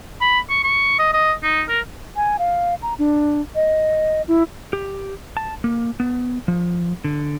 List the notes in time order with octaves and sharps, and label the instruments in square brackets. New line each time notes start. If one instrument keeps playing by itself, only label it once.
[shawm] B5
C#6
C#6
D#5
D#5
D#4
A#4
[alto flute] G#5
F5
A#5
D4
D#5
E4
[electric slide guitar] G4
A5
A#3
B3
F3
D3